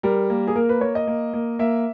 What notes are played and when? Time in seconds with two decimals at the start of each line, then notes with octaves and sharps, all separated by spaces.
0.03 G3 A#4
0.30 A#3
0.47 G#4
0.56 A#3 A#4
0.69 B4
0.81 A#3 C#5
0.95 D#5
1.07 A#3
1.33 A#3
1.59 A#3 E5